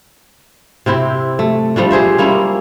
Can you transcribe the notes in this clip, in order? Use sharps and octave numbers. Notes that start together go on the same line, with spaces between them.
C3 C4 E4 G4
A3
F3 G3 A3 D4
G4 G#4 C5 E5
G3 A#3 C#4 E4